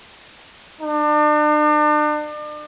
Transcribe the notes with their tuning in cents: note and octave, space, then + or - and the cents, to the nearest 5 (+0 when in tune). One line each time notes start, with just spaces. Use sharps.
D4 +40